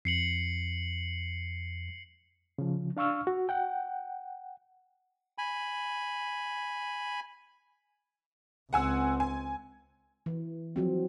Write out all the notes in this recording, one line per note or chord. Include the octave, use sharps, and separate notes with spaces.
F2 C7 C#7 F#7
C#3 F3
D4 F5 C#6 E6 F6
F#4
F#5 G5
G#5 B5
C#2 C4 F#5 G#5 E6
G#5
E3
F3 F#3 C4